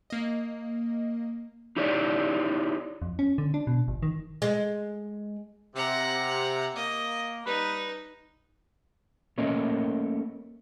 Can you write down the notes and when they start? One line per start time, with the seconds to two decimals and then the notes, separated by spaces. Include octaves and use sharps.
0.10 A#3 D#5
1.76 D#4 E4 G4 C#5 D5
3.02 F2
3.19 C#4
3.38 D3
3.54 D4
3.67 B2
3.88 G1
4.03 D#3
4.42 G#3
5.76 C3 F#5 A#5
6.76 A#3 D#5
7.46 G3 D#4 B4
9.38 A3 A#3 C#4 A#4 C#5 D#5